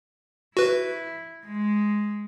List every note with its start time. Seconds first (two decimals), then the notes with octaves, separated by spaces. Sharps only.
0.57 E4 F#4 B4
1.46 G#3